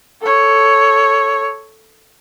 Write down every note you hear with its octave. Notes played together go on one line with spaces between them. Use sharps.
A4 C#5